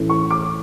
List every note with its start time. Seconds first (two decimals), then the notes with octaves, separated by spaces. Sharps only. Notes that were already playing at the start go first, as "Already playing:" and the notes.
Already playing: A2 E3 A3 C#4
0.10 C#6
0.31 D6